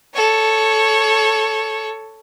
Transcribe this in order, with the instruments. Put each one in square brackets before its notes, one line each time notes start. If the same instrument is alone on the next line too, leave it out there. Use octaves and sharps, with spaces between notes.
[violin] A4 C#5